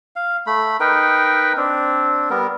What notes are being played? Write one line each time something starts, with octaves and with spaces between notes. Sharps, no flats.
F5
A3 B5
D#4 A#4 B4 G5
C4 D4
G3 B3 A#4